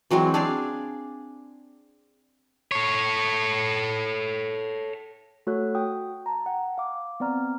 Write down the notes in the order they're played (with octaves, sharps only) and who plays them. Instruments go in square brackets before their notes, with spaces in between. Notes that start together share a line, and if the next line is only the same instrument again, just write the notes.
[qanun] E3 F#3 G#3 C4
D4 G#4 D5 F5
[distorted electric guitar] A4 C#5
[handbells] A3 F#4 A4 C#5 F#6
F#4 G5 D#6
A5 A#5
F#5 G5
F5 D6
B3 C4 D5 A#5 F6